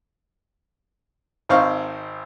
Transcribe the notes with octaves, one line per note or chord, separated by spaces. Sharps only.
G#1 C4 D#4 F5 C#6